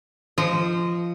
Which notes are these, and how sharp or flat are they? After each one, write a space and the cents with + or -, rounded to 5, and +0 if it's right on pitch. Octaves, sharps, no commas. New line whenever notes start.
F3 -20 D#5 -10